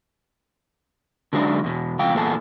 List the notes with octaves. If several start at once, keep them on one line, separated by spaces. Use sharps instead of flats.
D3 F#3 G#3 A3 D4 D#4
E2 B2
C#2 F3 F5 G5
E2 A#2 B3 G#4 A4